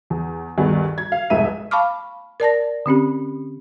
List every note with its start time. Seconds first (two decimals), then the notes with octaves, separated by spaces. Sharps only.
0.10 E2
0.58 D2 G2 D#3 B3 G#4
0.98 G#6
1.12 F5
1.30 F1 C2 G#2 B2 E5 D#7
1.71 F5 A5 B5 C#6 D6 F6
2.40 A#4 D5 A5 A#6
2.86 D3 C4 C#4 G4